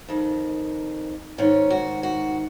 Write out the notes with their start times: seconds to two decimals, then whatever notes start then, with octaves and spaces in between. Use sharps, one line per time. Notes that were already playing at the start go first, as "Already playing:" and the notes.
0.08 F2 D#3
1.38 G#2 D#3 C#4
1.70 F#4
2.03 F#4